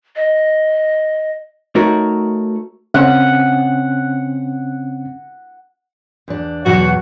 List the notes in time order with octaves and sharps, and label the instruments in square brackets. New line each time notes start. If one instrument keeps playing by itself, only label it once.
[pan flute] D#5
[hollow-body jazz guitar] A3 D#4 F#4 A#4 C#5
[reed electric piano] C#3 C4 C#4 [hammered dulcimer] F#5
[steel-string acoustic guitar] E2 D4
[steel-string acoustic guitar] E2 B2 F#3 [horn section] F#4